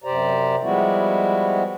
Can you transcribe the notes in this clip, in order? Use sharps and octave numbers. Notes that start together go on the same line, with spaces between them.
F#2 C3 G4 C5 D5 A#5
F3 G3 G#3 B3 E4 F#4